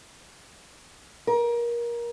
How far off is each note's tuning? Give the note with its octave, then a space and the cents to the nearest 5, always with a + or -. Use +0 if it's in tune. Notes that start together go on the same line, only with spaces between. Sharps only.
A#4 +25